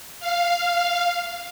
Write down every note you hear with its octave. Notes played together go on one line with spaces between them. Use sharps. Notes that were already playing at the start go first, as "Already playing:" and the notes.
F5